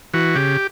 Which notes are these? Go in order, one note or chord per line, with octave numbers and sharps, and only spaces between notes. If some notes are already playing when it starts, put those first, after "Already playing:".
E3 F#4
C#3 G4